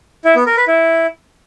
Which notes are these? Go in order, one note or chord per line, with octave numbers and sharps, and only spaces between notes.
E4
B3
A#4
B4
E4